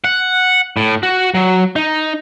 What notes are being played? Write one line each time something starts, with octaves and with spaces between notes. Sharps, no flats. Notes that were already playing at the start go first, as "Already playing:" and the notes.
F#5
A2
F#4
F#3
D#4